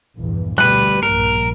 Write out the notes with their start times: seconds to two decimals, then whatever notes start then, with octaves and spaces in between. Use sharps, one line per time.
0.18 A#1 E2 G2
0.58 D2 B2 G3 B4 F#6
1.03 A#1 G2 A#2 A#4